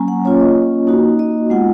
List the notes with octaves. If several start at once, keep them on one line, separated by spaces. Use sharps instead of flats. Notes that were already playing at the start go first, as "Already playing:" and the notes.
Already playing: F#3 A#3 C#4 G#5 A#5
F#5
A#3 C#4 F4 C#5
D#5
A#3 D#4 F#4
D#5
G#3 B3 F4 F#5